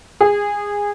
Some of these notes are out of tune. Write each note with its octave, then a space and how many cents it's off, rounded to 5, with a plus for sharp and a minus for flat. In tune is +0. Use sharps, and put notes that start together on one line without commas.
G#4 -20